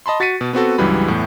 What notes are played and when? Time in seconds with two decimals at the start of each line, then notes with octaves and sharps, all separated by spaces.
0.06 D#5 A5 B5 C6
0.20 F#4 A6 B6 C#7 D#7
0.41 B2
0.53 B3 C4 F#4 A4
0.78 C#2 G2 E3 F#3 G3 B5
1.08 E2 A2